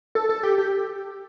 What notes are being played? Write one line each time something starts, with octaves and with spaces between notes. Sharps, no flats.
A4
A4
G4
G4